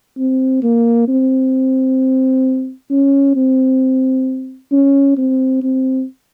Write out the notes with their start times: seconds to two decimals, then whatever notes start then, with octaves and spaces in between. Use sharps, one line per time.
0.18 C4
0.63 A#3
1.08 C4
2.90 C#4
3.36 C4
4.72 C#4
5.17 C4
5.63 C4